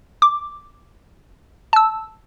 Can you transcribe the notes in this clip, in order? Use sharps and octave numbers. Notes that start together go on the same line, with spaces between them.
D6
A5 E6